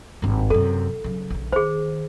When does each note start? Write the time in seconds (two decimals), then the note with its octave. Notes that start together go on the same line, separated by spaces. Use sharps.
0.22 G#1 G2
0.50 F#2 C3 A4
1.04 C#3 F#3
1.30 A#1 C#3
1.52 D#3 G#4 C5